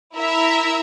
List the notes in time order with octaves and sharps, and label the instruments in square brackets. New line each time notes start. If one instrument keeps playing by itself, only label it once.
[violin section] E4 A#4 E5